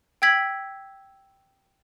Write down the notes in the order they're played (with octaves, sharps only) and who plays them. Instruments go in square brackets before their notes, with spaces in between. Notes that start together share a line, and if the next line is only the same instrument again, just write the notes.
[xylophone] G5 E6 G#6 B6 F#7